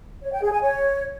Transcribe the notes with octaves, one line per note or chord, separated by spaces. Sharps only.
C#5
G5
G#4
G#5
C#5